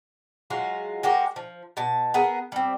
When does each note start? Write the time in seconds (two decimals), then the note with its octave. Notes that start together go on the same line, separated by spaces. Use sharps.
0.50 F#3 G#3 F4 F#4
1.03 G#3 F#4 G4 A#4
1.36 F3
1.77 B2 A5
2.14 B3 G#4 A#4
2.52 G3 C4